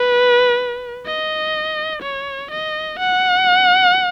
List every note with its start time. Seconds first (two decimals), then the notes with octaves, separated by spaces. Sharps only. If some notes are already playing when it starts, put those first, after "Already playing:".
Already playing: B4
1.06 D#5
2.02 C#5
2.51 D#5
2.99 F#5